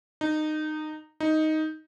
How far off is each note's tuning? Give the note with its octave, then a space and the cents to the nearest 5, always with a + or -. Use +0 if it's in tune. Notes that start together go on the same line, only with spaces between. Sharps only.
D#4 -20
D#4 +5